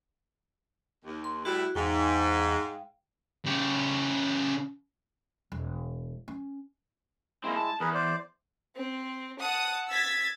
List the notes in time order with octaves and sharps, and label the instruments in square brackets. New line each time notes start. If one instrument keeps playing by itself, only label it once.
[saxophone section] D#2
[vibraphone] C6
[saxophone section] A2 G3 E4 [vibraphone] F#4
[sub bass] E2 [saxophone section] G#2 [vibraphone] F5 G5
[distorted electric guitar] C#3 G4
[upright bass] E1
C#4
[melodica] G#3 E4 [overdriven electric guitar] A#3 C4
[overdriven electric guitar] A5
[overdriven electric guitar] E2 [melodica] G#4 A#4 B4
[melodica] C5 D5
[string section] C4
F#5 A5 D#6
E6 G#6 A6 B6